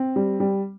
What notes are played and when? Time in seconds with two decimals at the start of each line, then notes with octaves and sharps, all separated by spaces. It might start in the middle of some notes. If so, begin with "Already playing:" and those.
Already playing: C4
0.16 G3
0.40 G3